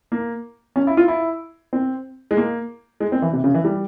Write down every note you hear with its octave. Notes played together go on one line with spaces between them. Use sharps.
A#3
C#4
E4
F4
E4
C4
G#3
A#3
G#3
C4
E3
C3
C#3
E3
G3